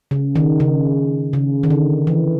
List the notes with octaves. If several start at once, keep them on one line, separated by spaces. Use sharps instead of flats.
C#3
D#3
C#3
C#3
D#3
D3
E3